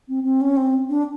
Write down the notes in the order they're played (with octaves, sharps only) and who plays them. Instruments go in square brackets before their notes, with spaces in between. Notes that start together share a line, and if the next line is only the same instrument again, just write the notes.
[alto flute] C4
C4
C#4
C4
D4